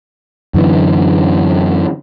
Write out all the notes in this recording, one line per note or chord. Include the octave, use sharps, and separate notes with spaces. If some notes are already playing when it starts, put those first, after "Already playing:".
F#2 D3 E3